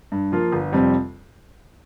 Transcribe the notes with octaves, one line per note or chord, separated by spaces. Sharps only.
G2
F3 A#3 F4
G1
F2 C3 G3 C4